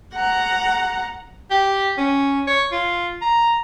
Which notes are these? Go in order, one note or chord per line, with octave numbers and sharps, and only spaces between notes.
F#5 A#5
G4
C#4
C#5
F4
A#5